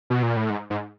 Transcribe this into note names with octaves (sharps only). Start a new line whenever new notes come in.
B2
A#2
A2
G#2
G#2